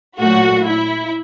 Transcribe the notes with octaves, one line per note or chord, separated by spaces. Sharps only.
A#2 F#3 A3 F#4
E4